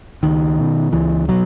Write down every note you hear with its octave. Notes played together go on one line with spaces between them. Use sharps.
C#2 D#3
B2
C#2 E3
B2 F#3